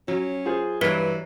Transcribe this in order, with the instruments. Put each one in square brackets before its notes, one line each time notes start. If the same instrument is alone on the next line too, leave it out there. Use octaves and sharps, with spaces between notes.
[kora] F#3 [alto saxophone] C#4
[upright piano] F4 G#4 C5
[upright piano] G2 [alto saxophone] E3 [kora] A#4 C#5 F#5 [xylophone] B4 B6